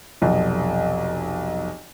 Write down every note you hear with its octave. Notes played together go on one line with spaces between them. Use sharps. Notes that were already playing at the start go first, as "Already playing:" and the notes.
F1 B1